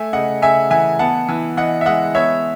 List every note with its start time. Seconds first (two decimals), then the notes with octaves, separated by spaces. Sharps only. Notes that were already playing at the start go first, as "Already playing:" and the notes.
Already playing: A3 E5 G#5
0.13 C#3 D#5 F#5
0.42 C#3 E5 G#5
0.70 E3 E5 G#5
0.99 B3 F#5 A5
1.29 E3
1.57 E3 D#5 F#5
1.81 E5
1.86 G#3 D#5 F#5
2.15 B3 C#5 E5